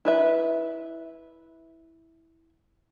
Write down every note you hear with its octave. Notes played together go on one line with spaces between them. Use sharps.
E4 B4 E5